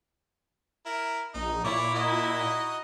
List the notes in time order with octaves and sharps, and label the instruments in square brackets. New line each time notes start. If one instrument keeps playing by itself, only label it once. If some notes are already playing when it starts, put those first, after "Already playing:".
[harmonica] E4 A#4
[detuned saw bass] A#1 [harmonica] D#4
[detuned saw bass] A#2 [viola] E4 [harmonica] C#5 D5
[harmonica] D#4 F#4 D#5